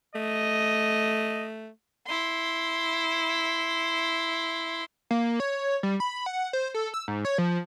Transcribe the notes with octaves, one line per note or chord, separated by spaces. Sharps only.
A3 D#5
E4 C6
A#3
C#5
G3
B5
F#5
C5
A4
E6
G#2
C#5
F3